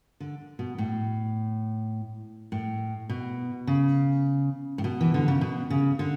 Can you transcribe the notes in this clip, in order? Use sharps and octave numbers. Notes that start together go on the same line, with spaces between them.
D3
B2
A2
A2
B2
C#3
A2
B2
E3
D3
C#3
B2
C#3
D3